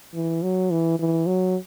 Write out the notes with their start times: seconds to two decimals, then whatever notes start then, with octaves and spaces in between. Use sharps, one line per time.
0.14 E3
0.42 F#3
0.71 E3
0.99 E3
1.27 F#3